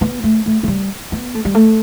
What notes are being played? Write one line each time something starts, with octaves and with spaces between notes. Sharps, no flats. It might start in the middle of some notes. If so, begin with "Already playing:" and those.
B3
A3
A3
A3
G3
B3
A3
G3
A3